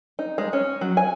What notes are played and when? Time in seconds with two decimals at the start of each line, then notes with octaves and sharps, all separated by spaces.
0.19 D#4
0.38 G#3
0.53 C#4
0.81 F#3
0.97 G#5